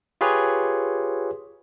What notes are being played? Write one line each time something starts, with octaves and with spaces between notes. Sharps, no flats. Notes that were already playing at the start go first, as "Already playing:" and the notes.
F4 G4 G#4 B4 C#5